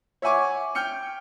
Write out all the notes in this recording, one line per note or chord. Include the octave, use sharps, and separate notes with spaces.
C#5 E5 F#5 G#5 C#6 D6
G5 F6 G6 C#7